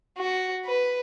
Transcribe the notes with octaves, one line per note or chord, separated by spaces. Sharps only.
F#4
B4